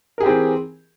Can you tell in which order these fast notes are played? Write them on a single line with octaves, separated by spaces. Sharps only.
A#4 G#4 G4 C4 E3